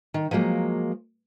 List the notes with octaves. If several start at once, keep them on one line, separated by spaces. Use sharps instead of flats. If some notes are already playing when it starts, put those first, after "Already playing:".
D#3
F3 F#3 G#3 A#3